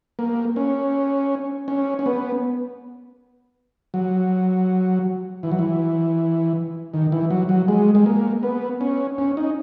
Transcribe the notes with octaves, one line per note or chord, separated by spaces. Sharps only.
A#3
C#4
C#4
C#4
B3
F#3
E3
F#3
E3
D#3
E3
F#3
F#3
G#3
G#3
A#3
B3
C#4
C#4
D#4